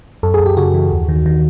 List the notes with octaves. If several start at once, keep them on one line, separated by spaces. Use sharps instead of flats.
F#2 A4
G#4
F#2
G4
C#3 F#4
E3
D#2
D#3
D#3